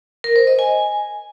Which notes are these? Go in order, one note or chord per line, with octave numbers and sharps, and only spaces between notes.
A#4
C5
D#5
G#5